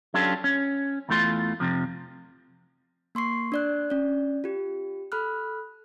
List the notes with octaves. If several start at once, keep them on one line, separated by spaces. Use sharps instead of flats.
F#3 C#4 D4 F4 G4 A4
C#4
E2 E3 A3 F4 C6
F2 C3 F3
A#3 C6 C#6 C7
D4 D5 F#6
C#4 D5
F4 G4
A4 B5 F6 F#6